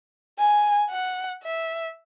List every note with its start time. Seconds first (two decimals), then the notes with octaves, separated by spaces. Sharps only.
0.39 G#5
0.90 F#5
1.43 E5